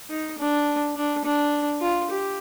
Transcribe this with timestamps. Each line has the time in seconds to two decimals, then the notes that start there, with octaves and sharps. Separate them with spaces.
0.10 D#4
0.38 D4
0.96 D4
1.24 D4
1.81 F4
2.10 G4